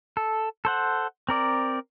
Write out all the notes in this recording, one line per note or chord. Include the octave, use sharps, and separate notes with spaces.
A4
A4 C5 F#5
C4 A#4 D5